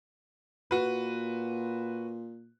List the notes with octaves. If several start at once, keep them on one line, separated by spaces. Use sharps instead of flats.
A#2 F#4 B4